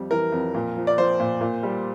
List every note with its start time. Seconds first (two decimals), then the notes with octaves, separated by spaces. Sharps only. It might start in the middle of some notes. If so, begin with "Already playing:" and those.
Already playing: F2 G3
0.11 E3 A#4
0.32 F2
0.54 A#2
0.76 F3
0.87 D5
0.98 F3 C5
1.20 A#2
1.41 A#2
1.63 G3